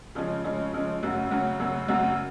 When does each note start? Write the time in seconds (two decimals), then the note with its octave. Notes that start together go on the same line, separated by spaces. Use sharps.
0.15 C#3 F3 G#3 C#4
0.44 C#3 F3 G#3 C#4
0.73 C#3 F3 G#3 C#4
1.03 F#2 C#3 F#3 C#4 F#4
1.31 F#2 C#3 F#3 C#4 F#4
1.60 F#2 C#3 F#3 C#4 F#4
1.88 F#2 C#3 F#3 C#4 F#4